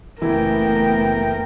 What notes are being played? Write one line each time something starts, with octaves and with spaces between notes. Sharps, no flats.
F#1 E3 A3 B3 E4 A#4 G5